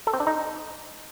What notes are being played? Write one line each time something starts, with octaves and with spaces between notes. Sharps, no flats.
A4
C4
D4
D#4